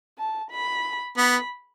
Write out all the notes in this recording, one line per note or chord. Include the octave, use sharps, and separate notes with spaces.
A5
B5
B3 B5